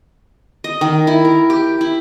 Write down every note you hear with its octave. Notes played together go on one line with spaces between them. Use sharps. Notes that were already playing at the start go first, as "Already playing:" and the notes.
D#5
D#3
E4
A#4
G4
E4